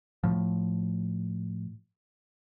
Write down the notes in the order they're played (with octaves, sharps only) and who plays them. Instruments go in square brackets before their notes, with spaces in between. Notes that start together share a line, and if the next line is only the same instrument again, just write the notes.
[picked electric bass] A2 F3